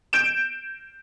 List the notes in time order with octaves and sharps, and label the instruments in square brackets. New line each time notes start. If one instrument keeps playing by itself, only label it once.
[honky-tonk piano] G6 D7 E7